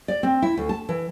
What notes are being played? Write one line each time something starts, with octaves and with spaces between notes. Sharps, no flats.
D5
C4
E4
D2
A5
E3